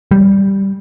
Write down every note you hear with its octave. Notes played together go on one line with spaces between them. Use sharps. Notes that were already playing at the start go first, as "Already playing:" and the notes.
G3